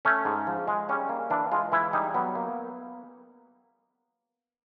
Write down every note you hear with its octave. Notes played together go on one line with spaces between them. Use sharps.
A3 C#4
G#2
F3
G#3
G3 C#4
A#3
E3 D4
G#3 F4
E3 E4
G3 D#4
F#3 B3
A#3